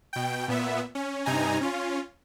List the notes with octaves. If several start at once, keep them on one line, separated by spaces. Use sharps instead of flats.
B2 G5
A#2 B3 E5
C#4
G2 C3 D#4 G#5 A#5
C#4 F4